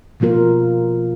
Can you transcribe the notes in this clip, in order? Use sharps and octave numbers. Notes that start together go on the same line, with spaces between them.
B2 F3 A#3 F4 A#4